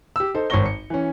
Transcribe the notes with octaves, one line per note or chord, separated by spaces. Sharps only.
G4 E6
D#4 A4 C5
G#1 C5 C#5 C#6 A#6 G7
C#7
E3 C#4